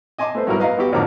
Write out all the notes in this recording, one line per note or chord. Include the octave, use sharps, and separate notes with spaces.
D#5 G#5 A5 C6 D6
A3 B4 C5
G2 F#3 E4 F#4 A#4
B4 D#5 F5 A#5
B3 F#4 G4
A1 F2 D3 A#4 D6